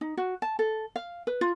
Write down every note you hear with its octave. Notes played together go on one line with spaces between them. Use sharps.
D#4
F#4
A5
A4
F5
B4
F4